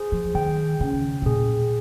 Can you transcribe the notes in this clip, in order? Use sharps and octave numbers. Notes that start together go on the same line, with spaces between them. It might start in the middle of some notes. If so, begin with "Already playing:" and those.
Already playing: G#4 C5
F3
D#3 G5
C#3 G5
C3
A#2 G#4